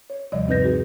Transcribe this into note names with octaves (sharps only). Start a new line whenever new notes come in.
C#5
D#2 C3 F3 G3 D5 D#5
G2 C4 D#4 B4 G6 A#6
D#4 F#4 G#4